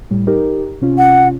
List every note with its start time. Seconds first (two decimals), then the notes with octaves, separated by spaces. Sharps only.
0.11 A2 G3
0.27 D#4 G4 A#4
0.82 C3 C#4 F4
0.98 F#5